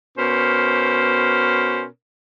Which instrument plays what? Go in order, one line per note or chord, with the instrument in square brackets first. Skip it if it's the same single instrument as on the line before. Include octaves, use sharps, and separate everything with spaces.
[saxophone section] B2 C#4 A#4 C5